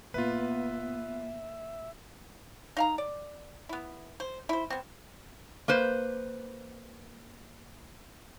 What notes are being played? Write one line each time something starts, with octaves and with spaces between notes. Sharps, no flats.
A#2 B3 F4 B4 E5
D#4 F5 A#5
D5
B3 E4
C5
E4 C5
B3 C4
A#3 B4 C5